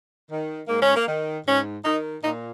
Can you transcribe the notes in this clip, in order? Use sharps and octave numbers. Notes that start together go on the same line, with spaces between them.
D#3
G#2 A#3
C#4
A#3
D#3
G#2 C#4
D#3 D#4
A#2 D#4